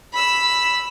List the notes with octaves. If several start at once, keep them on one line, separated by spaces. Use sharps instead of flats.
B5 E6